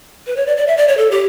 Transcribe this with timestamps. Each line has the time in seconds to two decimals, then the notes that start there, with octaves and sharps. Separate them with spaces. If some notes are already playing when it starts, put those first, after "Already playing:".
0.27 B4
0.37 C#5
0.47 D5
0.57 D5
0.67 E5
0.77 D5
0.88 C#5
0.97 A4
1.11 G4